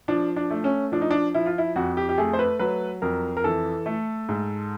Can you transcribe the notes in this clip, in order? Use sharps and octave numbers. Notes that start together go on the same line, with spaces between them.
F3 D4
D4
A3
C#4
F3 D4
D#4
D4
F3 E4
F4
E4
F2 F#4
G4
G4
A3 G#4
C5
B4
F#3 B4
F2 A#4
A#4
E3 A4
A3
G#2